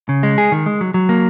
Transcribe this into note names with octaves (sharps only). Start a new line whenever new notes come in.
C#3
G#3
G#4
D#3
G#3
F#3
F#3
A#3